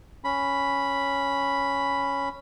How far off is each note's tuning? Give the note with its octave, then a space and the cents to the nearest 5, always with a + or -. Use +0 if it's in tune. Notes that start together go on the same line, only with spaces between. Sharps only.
C#4 +0 B5 +0